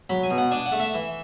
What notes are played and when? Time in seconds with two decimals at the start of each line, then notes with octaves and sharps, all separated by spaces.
0.10 F#3 B5
0.23 G#5
0.31 B2
0.38 F#5
0.51 D4 G#5
0.66 F#5
0.72 A3
0.80 E5
0.94 E3